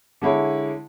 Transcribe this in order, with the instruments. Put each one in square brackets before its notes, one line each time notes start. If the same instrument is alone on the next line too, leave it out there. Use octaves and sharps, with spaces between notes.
[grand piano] D3 G#3 E4 C#5